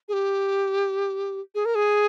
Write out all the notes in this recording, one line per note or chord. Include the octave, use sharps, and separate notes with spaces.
G#4
G4
G#4
A#4
G#4